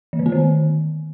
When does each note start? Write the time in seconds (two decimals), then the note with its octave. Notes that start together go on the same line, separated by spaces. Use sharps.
0.13 E3
0.19 D3
0.26 B3
0.32 D#3